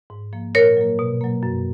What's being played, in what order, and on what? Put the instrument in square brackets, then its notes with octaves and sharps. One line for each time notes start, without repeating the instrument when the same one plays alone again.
[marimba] G#2
F3 A#3
A#2 A#4 C#5
F#3 A#3
B2
F#3 A#3
F#2